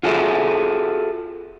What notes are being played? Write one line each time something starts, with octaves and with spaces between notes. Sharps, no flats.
F4 F#4 G#4 A4 E5